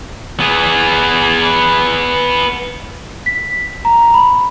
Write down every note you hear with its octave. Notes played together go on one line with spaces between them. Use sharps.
B3 G#4
B6
A#5
B5